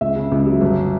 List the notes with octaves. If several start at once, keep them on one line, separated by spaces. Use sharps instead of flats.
C#2 E5
C#3
C#2
F#3
G1